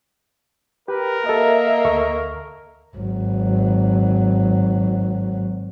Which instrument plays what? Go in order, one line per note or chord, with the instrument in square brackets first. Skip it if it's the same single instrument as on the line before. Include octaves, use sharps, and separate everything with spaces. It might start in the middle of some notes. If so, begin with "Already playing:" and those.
[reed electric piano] G4 [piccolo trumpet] A#4 [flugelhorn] B4
[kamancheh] A#3 E5 [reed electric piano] A4 A#5 [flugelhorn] D#5
[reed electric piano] D2 A4 C#6
[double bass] G#1 F#3